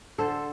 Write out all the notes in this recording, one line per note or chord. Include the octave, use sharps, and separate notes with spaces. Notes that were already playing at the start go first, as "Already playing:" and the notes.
D3 A4 C5